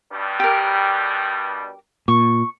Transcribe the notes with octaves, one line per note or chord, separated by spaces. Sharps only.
G2 B2 G3
G4 A#4
A#2 C#6